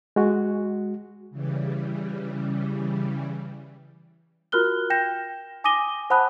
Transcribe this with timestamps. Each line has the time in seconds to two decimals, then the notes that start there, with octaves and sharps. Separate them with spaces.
0.16 G#3 F#4
1.30 C#3 E3 G3
4.52 F4 F#4 A#4 F6 F#6 G7
4.90 G5 G6 A#6 E7
5.64 G#5 D6 D#6 A#6 D#7 G7
6.10 C5 F#5 A5 B5 D#6 F#6